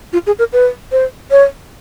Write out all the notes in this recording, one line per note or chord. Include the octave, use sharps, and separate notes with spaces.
F4
G#4
A#4
B4
C5
C#5